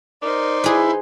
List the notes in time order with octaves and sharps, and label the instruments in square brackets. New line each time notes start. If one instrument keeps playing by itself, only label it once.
[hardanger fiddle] D#4 C5 [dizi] A#4 [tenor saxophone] D5
[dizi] E4 [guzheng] G#4 B4